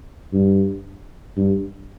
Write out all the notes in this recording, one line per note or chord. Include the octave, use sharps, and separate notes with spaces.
G2
G2